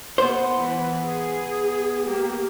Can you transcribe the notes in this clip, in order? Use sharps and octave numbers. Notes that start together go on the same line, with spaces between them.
B3 C5
E3 B4
G#4
A#3 G4